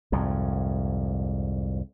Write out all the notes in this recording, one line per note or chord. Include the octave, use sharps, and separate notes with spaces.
C2 F2 G#2